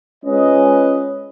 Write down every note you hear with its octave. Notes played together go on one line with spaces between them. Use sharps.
G#3 C#4 F4 B4 D#5